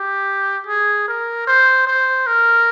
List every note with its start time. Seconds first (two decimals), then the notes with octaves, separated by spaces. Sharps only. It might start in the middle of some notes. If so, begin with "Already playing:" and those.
Already playing: G4
0.67 G#4
1.08 A#4
1.47 C5
1.87 C5
2.27 A#4